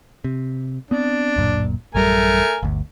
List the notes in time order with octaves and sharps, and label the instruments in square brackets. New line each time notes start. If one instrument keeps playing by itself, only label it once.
[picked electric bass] C3
[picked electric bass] B3 C4 [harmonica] D4
[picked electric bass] D1 F#2 A#2
[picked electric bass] A1 F#2 G3 [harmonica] A3 A#4 G#5
[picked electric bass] G1 D2